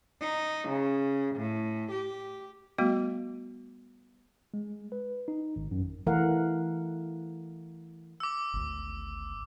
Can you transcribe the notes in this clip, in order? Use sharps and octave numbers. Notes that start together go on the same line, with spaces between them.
D#4
C#3
A2
G4
G3 A3 B3 F#4
G#3
B4
D#4
G#1
F#2
E3 A3 A#4 F5 F#5
D6 E6
G#1 D2